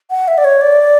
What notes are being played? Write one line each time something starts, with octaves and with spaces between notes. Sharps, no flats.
F#5
E5
D5
C#5
D5